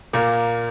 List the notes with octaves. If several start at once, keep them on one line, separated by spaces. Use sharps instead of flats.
A#2 A#3